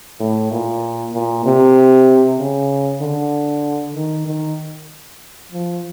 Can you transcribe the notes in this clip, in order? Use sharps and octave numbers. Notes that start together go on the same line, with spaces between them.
A2
A#2
A#2
C3
C#3
D3
D#3
D#3
F3